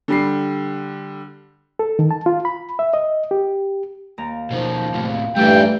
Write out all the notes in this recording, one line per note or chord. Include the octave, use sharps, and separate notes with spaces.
D3 G3 C7
A4
D#3
A5
F4
B5
E5
D#5
G4
D#2 A#5
B2 D#3 F3
A2 C3 F4
G2 E3 G3 A3 D#4 G4 A4 G5